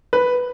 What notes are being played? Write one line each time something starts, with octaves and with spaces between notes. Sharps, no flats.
B4